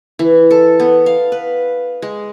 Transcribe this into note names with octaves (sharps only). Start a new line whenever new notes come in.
E3
A4
B3
F5
B4
G#3